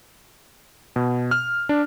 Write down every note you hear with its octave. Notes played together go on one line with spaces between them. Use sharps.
B2
F6
D4